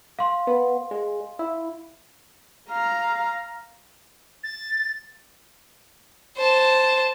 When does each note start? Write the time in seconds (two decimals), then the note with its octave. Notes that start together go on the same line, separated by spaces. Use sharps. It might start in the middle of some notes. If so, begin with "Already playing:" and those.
0.19 F5 C6
0.47 B3
0.91 G#3
1.39 E4
2.69 F5 A#5
4.43 A6
6.37 C5 A5